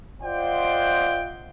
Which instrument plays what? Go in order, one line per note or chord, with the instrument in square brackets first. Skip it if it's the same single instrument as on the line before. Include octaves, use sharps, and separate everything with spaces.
[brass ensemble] F4 C5 D5 D#5 F#5 G5